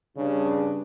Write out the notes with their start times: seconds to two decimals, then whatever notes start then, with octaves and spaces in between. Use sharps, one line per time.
0.17 G2 C#3 D4